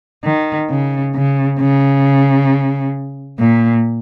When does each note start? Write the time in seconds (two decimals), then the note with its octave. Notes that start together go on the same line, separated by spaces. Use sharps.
0.24 D#3
0.70 C#3
1.15 C#3
1.60 C#3
3.39 A#2